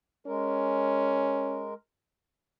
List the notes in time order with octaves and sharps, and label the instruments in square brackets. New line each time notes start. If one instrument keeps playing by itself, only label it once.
[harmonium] G#3 A#4 [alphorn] C#4